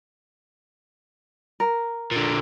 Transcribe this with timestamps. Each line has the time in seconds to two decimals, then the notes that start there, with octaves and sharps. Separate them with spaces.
1.60 A#4
2.12 A#2 D3